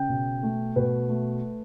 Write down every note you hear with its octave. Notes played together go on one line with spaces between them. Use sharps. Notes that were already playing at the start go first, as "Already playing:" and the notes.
Already playing: C#3 G5
B2
A3
B2 B4
A3